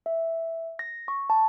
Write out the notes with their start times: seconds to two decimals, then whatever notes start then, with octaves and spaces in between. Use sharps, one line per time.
0.06 E5
0.79 A#6
1.08 C#6
1.30 A5